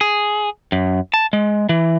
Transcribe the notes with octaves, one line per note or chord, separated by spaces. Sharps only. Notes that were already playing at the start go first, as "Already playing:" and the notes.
G#4
F#2
A5
G#3
E3